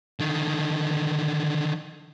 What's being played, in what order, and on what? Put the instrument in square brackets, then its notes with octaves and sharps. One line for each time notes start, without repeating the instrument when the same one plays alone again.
[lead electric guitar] D3 D#3